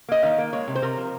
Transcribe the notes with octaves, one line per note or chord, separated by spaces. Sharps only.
A#3 D#5
D#3 F5
A#3
G#3 C#5
C3
C5
C3 A#4
F3